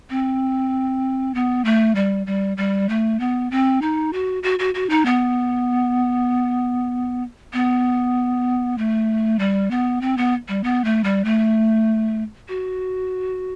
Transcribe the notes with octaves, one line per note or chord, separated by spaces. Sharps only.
C4
B3
A3
G3
G3
G3
A3
B3
C4
D#4
F#4
F#4
F#4
F#4
D#4
B3
B3
A3
G3
B3
C4
B3
G3
B3
A3
G3
A3
F#4